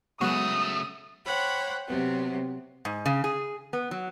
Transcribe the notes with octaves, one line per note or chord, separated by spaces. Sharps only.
C#3 F#3 G#3 A3 B3 C#6 D#6
C5 C#5 F#5 G5 B5
C3 F#3 B3 C4
G#2
C#3
G#4
B3
F#3